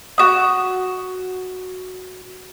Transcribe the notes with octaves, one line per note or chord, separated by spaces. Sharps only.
F#4 D#6